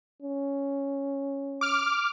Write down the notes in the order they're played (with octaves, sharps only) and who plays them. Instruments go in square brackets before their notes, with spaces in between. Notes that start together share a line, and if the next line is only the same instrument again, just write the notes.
[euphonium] C#4
[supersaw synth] D6 F6